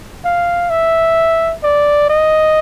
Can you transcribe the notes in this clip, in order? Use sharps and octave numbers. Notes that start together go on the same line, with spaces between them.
F5
E5
D5
D#5